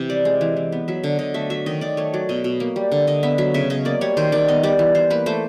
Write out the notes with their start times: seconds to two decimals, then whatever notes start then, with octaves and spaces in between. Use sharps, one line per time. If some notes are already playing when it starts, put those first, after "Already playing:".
Already playing: C3 E3
0.10 G3 D5
0.25 G#3
0.41 E3
0.57 E3
0.72 B3
0.88 F#3 E5
1.03 D3
1.19 D3 D#5
1.34 A3 E5
1.50 F#3 E5
1.66 D#3 D#5
1.81 D#3 D5
1.97 A3 C#5
2.13 F#3 D5
2.29 B2 D#5
2.44 B2
2.60 A#3
2.76 G3
2.92 D3
3.07 D3 D#5
3.23 B3 E5
3.38 F#3 E5
3.54 C#3 E5
3.70 C#3 D#5
3.85 A#3 D5
4.01 G3 C#5
4.17 D#3 C5
4.32 D#3 D5
4.48 B3 D#5
4.63 G3 D5
4.79 E3
4.95 E3 C5
5.10 A#3 B4
5.26 A3 C5